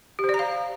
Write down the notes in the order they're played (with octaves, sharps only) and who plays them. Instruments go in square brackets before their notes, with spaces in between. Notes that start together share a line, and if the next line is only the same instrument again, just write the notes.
[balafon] G4
C5
D5
A#5
F5